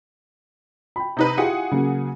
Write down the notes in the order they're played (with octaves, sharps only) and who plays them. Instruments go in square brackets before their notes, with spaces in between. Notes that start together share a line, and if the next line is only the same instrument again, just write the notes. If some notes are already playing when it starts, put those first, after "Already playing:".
[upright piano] G5 B5
[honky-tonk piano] C3 D#4 B4
[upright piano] E4 F4 G4 [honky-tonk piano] G#4 F#5
[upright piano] C#3 F#3 A#3